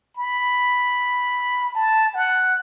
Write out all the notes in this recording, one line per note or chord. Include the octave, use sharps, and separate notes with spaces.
B5
A5
F#5